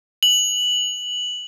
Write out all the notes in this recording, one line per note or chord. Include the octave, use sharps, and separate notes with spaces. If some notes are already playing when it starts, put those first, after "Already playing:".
F#7